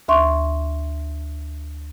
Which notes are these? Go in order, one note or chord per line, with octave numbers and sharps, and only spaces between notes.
D2 E5 C6 C#6